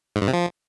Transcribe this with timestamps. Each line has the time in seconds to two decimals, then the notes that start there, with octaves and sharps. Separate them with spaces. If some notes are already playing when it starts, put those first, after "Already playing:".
0.16 G#2
0.22 G2
0.27 C3
0.33 F3